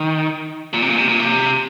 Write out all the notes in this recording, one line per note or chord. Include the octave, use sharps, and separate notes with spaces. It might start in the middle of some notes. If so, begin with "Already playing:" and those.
Already playing: D#3
A#2
C3
A#2
C3
A#2
C3